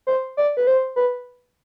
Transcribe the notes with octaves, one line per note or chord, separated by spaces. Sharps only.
C5
D5
B4
C5
B4